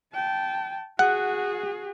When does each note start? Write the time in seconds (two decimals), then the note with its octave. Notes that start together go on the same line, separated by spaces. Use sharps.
0.14 G5 A5
0.99 F#4 G#4 F#5